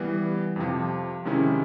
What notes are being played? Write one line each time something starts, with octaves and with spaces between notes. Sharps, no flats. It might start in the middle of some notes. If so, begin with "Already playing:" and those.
Already playing: E3 G3 B3
F2 C3 F3
C3 D#3 G#3 C#4 E4